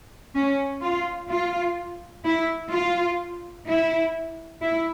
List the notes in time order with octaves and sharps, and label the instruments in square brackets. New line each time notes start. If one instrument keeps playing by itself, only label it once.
[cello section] C#4
F4
F4
E4
F4
E4
E4